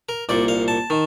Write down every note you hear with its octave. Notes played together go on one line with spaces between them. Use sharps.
A#4
C2 A#2 D5
F5
A5
D#3